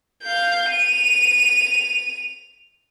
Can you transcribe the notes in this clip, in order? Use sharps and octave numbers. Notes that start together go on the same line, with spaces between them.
F5 G6
D#7 F7